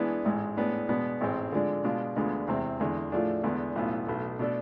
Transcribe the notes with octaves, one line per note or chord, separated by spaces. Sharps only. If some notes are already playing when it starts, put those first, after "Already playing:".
Already playing: E3 G#3 B3 D4 G#4
A1 G#2 G#3
A2 G#3 B3 D4
B2 G#3 B3 D4
A1 G#2 G#3 C4
D3 F3 G#3 D4
B2 G#3 D4 F4
D2 D3 G#3 B3 F4
E2 C3 G#3 C4
E2 D3 G#3
A2 F3 A3 D4 G#4
E2 D3 G#3 B3 D4
B1 A2 E3 B3 F4
B1 B2 A3
B2 A3 D4 A4